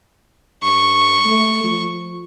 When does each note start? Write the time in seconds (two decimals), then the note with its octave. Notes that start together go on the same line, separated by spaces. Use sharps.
0.63 G2 C#6
1.25 A3
1.64 F3